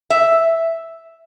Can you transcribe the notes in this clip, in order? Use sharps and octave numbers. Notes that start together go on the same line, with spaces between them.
E5